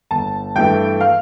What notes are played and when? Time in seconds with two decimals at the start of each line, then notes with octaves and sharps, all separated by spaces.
0.11 G1 A5
0.56 G2 E3 A3 G5
1.00 F5